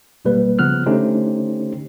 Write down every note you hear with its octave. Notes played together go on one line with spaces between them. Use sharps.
G#1 B2 G3 A#3 B4
C#3 F3 B3 F6 F#6
D3 A3 C#4 D#4 G4 C5